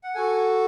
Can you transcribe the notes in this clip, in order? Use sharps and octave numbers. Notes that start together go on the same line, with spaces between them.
F#5
F#4 A4 G#5